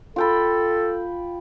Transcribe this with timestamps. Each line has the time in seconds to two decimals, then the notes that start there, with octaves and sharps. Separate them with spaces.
0.16 F4 A4 G5 B5